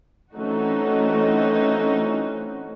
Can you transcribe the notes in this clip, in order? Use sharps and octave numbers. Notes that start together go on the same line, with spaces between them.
E3 A3 C4 C#4 D#4 F#4